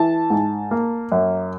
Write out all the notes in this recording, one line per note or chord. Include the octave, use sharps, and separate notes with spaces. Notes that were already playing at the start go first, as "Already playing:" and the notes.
Already playing: E3 A5
G#2
A#3
F#2